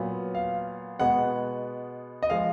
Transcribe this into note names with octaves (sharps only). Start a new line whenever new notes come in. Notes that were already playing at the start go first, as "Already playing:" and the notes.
Already playing: A#2 F#3 B3
F5
B2 G#3 B3 F#5
D#5
F3 G#3 F5